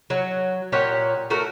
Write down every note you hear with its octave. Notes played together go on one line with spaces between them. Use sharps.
F#3
A#2 G4 C#5 F#5
A3 F#4 A#4